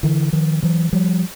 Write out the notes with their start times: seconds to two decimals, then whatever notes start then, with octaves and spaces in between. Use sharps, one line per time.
0.03 D3 E3
0.33 D#3 F3
0.62 E3 F#3
0.93 F3 G3